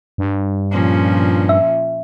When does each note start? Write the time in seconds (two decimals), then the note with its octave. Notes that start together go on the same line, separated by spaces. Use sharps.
0.18 G2
0.71 A#2 F3 C#4
1.49 E5